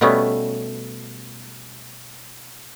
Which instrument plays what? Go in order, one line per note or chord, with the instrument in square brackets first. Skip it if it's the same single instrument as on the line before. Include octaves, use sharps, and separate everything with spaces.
[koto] B2 G3 A3 B3 C#4